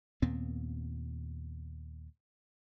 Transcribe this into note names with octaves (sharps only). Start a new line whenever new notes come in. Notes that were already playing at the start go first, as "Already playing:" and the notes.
D#2 A#2 B3 C4